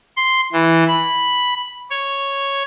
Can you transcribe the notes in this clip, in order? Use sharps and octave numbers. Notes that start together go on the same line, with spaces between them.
C6
E3
B5
C#5